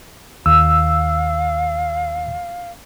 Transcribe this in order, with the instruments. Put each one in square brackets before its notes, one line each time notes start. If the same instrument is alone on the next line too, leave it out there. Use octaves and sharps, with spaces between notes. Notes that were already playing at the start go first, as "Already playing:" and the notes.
[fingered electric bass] D#2 [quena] F5 [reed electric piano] E6